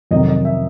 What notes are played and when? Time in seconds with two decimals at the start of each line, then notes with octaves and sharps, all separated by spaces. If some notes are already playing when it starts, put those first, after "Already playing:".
0.11 F2 C3 D#3 F#3 D#5
0.28 D#5
0.45 E5